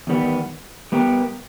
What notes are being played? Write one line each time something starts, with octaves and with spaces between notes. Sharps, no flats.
E2 D#3 G3 B3
G3 B3 G4 A#4